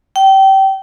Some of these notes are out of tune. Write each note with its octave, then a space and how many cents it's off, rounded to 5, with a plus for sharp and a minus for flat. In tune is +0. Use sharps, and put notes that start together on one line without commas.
G5 -25